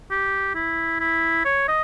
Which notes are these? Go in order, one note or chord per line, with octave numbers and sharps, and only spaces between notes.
G4
E4
E4
C#5
D#5